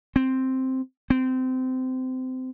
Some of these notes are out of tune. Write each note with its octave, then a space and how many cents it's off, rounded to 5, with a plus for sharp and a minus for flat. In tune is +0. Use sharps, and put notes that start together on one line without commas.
C4 +0
C4 -25